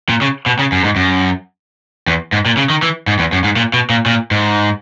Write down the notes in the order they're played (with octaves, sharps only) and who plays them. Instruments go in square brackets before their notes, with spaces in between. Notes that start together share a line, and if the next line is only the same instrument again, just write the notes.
[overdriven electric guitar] A#2
C#3
B2
C#3
F#2
G#2
F#2
E2
G#2
A#2
C#3
D#3
E3
G#2
E2
F#2
G#2
A#2
B2
A#2
A#2
G#2